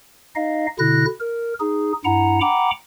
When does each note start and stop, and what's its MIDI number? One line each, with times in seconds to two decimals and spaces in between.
0.36 0.67 63
0.36 0.67 75
0.36 0.67 77
0.79 1.05 47
0.79 1.05 50
0.79 1.05 64
0.79 1.05 90
0.79 1.05 94
1.20 1.54 70
1.60 1.93 63
1.60 1.93 68
2.05 2.40 43
2.05 2.40 64
2.05 2.40 78
2.05 2.40 82
2.41 2.71 78
2.41 2.71 79
2.41 2.71 82
2.41 2.71 83
2.41 2.71 86